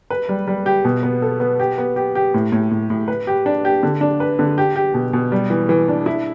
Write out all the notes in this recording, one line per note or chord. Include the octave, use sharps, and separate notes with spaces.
B4
G3
G3
G4
B2
B3
A4
B3
G4
B3
G4
G4
A2
A2
A2
A2
B4
G4
D4
G4
D3
D4
B4
D3
G4
G4
B2
B2
G3
E3
E3
D4
E4